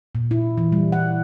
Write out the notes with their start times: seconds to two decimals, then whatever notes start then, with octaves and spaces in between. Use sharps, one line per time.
0.15 A#2
0.31 E4
0.58 E3
0.72 G3
0.92 F#5